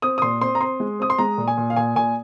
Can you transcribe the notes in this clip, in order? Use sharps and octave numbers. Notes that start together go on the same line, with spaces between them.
C4 D#6
D#6
A#2 C6
C4 C6
A#5
C4 C6
G#3
C4 D#6
C6
G#3 A#5
A#2
G#5
A#2
F5
A#2 G#5
A#2 G#5